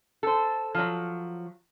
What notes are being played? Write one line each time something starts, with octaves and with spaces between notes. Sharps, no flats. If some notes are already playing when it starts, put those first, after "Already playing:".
A4 C5
F3 F#3